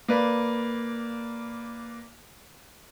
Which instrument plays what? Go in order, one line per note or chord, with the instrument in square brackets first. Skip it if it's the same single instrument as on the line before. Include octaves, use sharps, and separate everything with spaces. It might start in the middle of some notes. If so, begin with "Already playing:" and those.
[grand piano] A#3 B4 D5